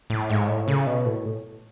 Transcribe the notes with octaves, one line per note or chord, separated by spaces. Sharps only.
A2
G#2
A2
C#3
B2
A2